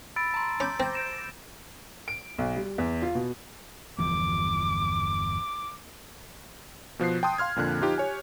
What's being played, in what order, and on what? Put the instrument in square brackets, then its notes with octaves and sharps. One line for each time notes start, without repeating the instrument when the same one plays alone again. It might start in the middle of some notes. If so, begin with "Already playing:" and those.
[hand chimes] B5 [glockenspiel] E6 A6 D7
[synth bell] A5 [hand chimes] A#5 C6
[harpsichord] C#4 [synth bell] B5 D6 G6
[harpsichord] C4 [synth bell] C5 G6 A#6
[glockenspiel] D7 E7
[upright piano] D7
B1
G3
E2
F4
B2
[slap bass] G1 E2 F3 [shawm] D6
[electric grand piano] B2 F3 F#6 C7
G5 A5 C6 D#6
F5 C6 F6 G#6
F2 A#2 D3 F#6
F3 D#4 F4 G4
G4 C#5 G#5